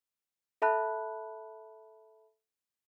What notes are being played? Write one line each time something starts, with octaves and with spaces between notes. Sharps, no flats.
A4 E5 A5 B5 F#6